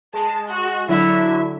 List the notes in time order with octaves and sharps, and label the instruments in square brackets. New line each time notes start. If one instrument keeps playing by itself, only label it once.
[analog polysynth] G#3 [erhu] A5
[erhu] F#4
[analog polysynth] D3 F#3 [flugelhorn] E4 [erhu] E5